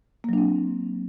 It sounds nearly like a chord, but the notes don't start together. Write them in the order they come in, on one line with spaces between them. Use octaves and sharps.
A#3 F#3 D4 C4